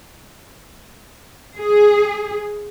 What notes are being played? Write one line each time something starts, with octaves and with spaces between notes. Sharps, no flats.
G#4